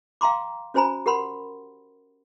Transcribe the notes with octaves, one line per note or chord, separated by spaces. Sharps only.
F5 G5 A#5 C6 D6
C#4 F#4 C5 G#5 A#5 B5
G4 A#4 F#5 B5 C6